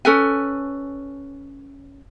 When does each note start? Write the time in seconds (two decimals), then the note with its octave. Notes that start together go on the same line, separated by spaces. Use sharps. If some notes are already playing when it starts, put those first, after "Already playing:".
0.05 C#4 A4 B4 G#5